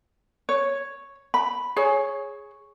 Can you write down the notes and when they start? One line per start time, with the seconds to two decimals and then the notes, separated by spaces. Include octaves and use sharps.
0.49 C#5
1.34 B5
1.76 G#4 C#5